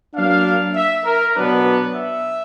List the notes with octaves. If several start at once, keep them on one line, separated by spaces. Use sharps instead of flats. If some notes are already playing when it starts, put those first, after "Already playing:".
F#3 A#3 D4 F5
E5
A#4
B2 F#3 B3 D4 B4
E5